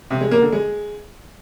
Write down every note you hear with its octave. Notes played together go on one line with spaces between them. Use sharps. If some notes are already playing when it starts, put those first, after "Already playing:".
C3
G#3
A#3
D3
G#3